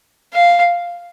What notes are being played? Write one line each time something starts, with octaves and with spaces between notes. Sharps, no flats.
F5